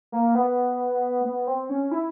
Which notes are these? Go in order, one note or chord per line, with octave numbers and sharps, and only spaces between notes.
A#3
B3
B3
C4
C#4
E4